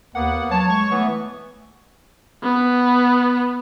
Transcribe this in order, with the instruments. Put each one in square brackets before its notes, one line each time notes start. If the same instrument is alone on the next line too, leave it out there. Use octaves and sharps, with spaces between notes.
[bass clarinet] D#2 [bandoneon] A#3 B3 [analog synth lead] F#5
[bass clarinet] F#3 [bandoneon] C#5 [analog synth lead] A5
[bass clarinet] G#3 [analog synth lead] C#6
[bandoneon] E3 B3 [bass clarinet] A3
[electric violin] B3